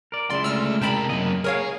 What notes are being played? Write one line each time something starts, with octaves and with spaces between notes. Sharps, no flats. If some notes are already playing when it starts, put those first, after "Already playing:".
A#4 D5
C#2 G#3 E4 D5 C6
A3 D5 E6 F6
C3 A#4 G5 A5 B5
F#2 A#3 D#5
G#4 A#4 C#5 F5